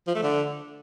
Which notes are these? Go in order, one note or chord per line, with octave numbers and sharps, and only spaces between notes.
F3
A3
D3